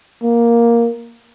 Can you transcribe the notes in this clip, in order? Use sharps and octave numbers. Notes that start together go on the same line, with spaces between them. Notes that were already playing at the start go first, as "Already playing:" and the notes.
A#3